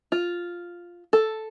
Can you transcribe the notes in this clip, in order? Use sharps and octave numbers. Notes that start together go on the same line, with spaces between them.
F4
A4